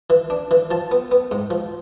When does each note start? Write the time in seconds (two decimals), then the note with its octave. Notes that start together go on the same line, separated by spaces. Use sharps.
0.10 E3
0.30 D4
0.51 E3
0.71 F3 A5
0.91 B3
1.11 B3
1.31 G#2
1.50 F3